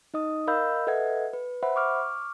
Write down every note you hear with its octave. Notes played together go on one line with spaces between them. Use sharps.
D#4 D#5 D#6
A#4 D#5 F5 B5 E6 G6
A4 B4 D#5 E5 F#5 G#6
B4
C5 E5 F#5 B5
C#6 D6 F6